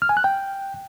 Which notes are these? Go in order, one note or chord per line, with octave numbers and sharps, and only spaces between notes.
F6
G#5
F#6
G5